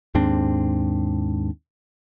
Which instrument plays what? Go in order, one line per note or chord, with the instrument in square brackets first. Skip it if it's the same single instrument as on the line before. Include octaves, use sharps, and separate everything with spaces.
[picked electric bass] D#2 G#2 C4 D4